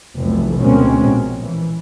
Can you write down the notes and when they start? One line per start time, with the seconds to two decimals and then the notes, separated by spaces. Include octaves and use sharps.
0.17 F1 B1 E3 A3
0.60 D2 B2 G#3 A#3 C4 C#4
1.05 A#1
1.42 E3